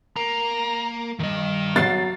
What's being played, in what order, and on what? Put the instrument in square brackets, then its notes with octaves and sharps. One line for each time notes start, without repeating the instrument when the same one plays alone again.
[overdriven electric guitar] A#3 [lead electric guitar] A#5
[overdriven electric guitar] D2 G2 [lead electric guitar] D#3 D#5
[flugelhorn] F#3 [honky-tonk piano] A6 C7